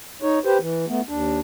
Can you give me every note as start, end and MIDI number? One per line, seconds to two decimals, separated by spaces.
0.22 0.39 63
0.22 0.39 73
0.45 0.58 67
0.45 0.58 71
0.45 0.58 72
0.59 0.85 52
0.88 1.01 57
0.88 1.01 59
1.09 1.40 39
1.09 1.40 62